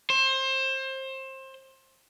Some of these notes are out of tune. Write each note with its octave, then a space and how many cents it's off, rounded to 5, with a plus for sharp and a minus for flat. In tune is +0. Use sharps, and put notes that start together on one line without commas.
C5 +25